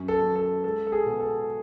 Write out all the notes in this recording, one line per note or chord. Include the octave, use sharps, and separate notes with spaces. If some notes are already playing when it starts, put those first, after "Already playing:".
Already playing: F#2
A4
F#2
A4
G#3 A4
A4
G#4
B2
A4